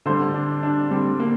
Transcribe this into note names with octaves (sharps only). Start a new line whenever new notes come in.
D3 G3 C5
D4
D4
D3 G3 C4
A#3